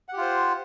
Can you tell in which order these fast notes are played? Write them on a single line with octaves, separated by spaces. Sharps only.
F#5 G4 F4 C5